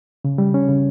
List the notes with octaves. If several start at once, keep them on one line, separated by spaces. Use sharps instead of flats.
C#3
G3
C#4
C#3